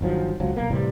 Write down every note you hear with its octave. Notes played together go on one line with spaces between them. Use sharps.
G1 D#3 F3 F#3
C#2 F3 F#3
B1 A#3
A2 C3 E3 G3